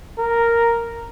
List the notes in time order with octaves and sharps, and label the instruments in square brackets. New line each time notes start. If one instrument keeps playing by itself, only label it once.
[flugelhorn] A#4